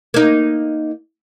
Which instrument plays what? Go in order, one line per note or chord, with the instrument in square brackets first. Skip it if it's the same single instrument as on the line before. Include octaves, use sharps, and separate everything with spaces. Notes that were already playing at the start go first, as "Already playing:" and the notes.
[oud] A#3 D#4